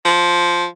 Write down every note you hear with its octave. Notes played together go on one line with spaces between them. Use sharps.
F3